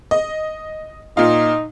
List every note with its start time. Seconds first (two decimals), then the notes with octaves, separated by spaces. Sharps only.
0.11 D#5
1.17 A#2 D#4 F4